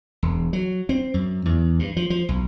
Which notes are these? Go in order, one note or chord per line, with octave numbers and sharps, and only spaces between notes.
E1
F#3
C4
F#2
E2
G2
F3
F3
B1